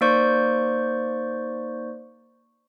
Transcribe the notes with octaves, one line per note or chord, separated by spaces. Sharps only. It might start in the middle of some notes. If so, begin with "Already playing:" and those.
A#3 D#4 C5 D5 C#6 G6